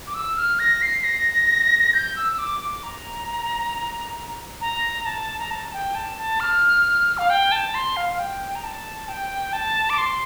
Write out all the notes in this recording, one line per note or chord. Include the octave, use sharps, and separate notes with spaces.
D6
E6
F6
A#6
C7
A#6
G6
E6
E6
D6
D6
A#5
A#5
A5
A#5
A5
G5
A5
A5
F6
F5
G5
A5
C6
F5
F5
G5
A#5
A5
G5
A5
D6
C6